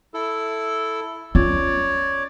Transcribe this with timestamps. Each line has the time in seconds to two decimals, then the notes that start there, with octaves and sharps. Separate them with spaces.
0.14 E4 A4
1.35 C#4 F4 C#5 D5